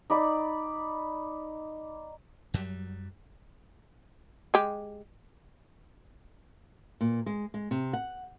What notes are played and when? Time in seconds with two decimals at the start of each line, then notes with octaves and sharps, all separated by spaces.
0.10 D#4 D5 B5
2.54 F#2 F#3 G3
4.54 G#3 G4
7.01 A#2
7.26 G#3
7.54 G#3
7.71 C3
7.93 F#5